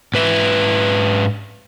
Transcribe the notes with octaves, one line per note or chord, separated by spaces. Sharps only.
G#2 B4 E5